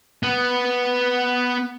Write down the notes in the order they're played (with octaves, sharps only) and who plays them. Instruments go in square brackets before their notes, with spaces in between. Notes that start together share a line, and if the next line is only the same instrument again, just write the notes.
[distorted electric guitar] B3